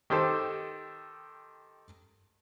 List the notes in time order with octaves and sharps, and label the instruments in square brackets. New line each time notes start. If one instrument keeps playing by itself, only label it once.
[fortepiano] D#3 G4 A4 C5